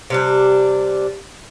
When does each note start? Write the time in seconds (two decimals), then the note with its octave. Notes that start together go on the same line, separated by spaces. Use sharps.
0.10 C3 G3 D4